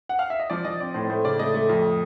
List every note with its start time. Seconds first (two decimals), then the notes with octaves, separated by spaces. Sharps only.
0.09 F#5
0.19 F5
0.30 E5
0.40 D#5
0.50 F3 D5
0.65 F3 D#5
0.80 C4 D5
0.94 A2 C5
1.10 A3 C5
1.24 C#3 D5
1.39 A3 D#5
1.54 A3
1.69 F2